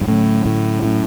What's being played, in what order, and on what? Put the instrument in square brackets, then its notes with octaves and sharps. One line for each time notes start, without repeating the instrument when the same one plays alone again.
[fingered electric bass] G2
[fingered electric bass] A2 [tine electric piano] D3 F#3 A3 C#4 E4
[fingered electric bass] A2
[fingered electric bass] A2 [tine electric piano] F#3 C#4 E4